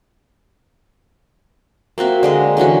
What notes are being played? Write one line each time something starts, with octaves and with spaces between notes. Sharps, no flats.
A#3 C4 F#4 E5
D3 G#3 D#5
D3 E3 C#4 F#4